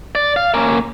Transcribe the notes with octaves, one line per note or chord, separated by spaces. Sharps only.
D5
F5
A#3 C#4